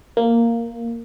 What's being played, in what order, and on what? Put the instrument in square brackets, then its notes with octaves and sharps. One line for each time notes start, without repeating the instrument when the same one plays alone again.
[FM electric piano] A#3